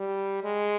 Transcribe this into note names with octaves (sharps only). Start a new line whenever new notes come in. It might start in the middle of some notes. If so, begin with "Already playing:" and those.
Already playing: G3
G#3